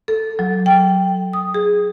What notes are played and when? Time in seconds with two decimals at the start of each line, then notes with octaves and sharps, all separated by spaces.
0.08 A4
0.39 F#3
0.66 G5
1.33 D#6
1.54 G#4